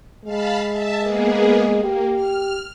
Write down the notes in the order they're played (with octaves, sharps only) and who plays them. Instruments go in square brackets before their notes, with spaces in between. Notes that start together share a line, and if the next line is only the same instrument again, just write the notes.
[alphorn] G#3 [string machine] F5 A5 B5
[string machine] E5 A5
A#3 B3 G#4
[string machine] A#3 [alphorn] G4
[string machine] F6